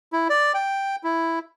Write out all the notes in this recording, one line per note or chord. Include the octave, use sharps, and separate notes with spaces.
E4
D5
G5
E4